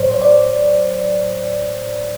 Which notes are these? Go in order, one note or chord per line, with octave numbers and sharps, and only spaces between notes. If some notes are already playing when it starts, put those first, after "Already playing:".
Already playing: A2 F#3 C5 C#5
C#5
D5